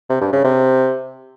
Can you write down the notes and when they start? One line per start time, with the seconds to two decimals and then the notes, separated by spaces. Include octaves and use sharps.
0.09 C3
0.21 G2
0.32 C#3
0.44 C3